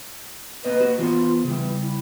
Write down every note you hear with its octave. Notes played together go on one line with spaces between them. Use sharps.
A#3 B4 C5 D#5
A#3 F#4
E3 B3 F4 C5
C#3 E3 G3
E4